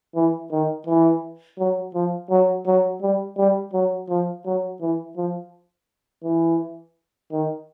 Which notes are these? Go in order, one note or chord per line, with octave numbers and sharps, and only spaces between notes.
E3
D#3
E3
F#3
F3
F#3
F#3
G3
G3
F#3
F3
F#3
E3
F3
E3
D#3